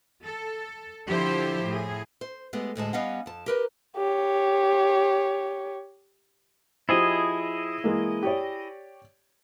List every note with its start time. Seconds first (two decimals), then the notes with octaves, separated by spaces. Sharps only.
0.24 A4
1.07 D3 F3 E4 G4 A4 C5
1.65 A2 G#4
2.21 C5
2.53 G#3 A3 B3 G4
2.75 D2 A2 G#3 A5
2.93 G3 B3 C#4 D#5 F5 F#5
3.26 F2 A5
3.46 G4 A#4 B4
3.97 G4 C#5
6.89 F3 E4 G4 G#4 C5 D#5
7.84 E3 G#3 A#3
8.23 G4 C#5 D5